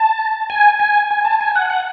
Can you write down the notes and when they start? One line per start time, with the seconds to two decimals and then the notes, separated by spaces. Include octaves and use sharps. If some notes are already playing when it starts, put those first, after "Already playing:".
Already playing: A5
0.50 G#5
0.80 G#5
1.11 G#5
1.25 A5
1.41 G#5
1.55 F#5
1.70 F#5